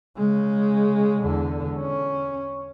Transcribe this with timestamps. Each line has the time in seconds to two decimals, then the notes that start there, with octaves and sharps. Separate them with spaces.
0.17 C#3 G#3
1.22 E2 D3
1.79 C#4